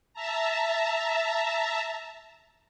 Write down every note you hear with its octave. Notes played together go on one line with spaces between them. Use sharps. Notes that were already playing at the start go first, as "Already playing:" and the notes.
E5 A5 A#5